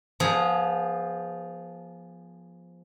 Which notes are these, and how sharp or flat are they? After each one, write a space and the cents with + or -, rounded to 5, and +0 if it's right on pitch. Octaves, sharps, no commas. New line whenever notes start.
F3 +0 B3 -30 G#4 +0